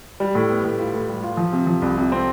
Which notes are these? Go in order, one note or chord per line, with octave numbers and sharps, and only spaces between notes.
G3
A2
B3
A2
F4
A2
G3
F4
F3
C3
F3
C2
C3
C4